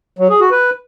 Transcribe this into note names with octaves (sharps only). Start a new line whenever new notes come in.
F#3
G#4
F#4
B4